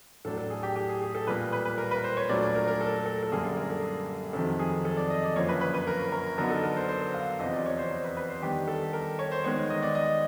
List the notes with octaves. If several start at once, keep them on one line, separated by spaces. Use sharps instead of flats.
A2 F#3 A3 D4 A4
A4
G#4
G4
G4
G#4
G#4
A4
A#2 G3 A#3 B4
B4
B4
A#4
B4
C5
C#5
A#2 F#3 A3 D4 D5
D5
A#4
A#4
A4
A4
A4
F#2 D3 G3 A#3 G#4
A4
A#4
A4
F2 C3 D#3 F#3 A4
G#4
A4
D5
D#5
D5
F#2 D3 F3 A#3 C#5
B4
B4
B4
A#4
A#4
D3 F#3 B3 D#4 A#4
A4
A#4
C5
C5
F5
E2 C3 F3 D#5
D5
C#5
C5
C5
B4
B4
C5
D#3 G3 B3 D4 G4
A4
A#4
C#5
C5
D#3 G#3 B3 C#5
D#5
D5
D#5